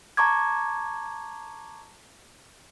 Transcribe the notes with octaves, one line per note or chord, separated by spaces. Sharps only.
A5 A#5 C#6 D6 G#6